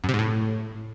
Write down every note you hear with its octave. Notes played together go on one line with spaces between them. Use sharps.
F#2
C3
G#2
A2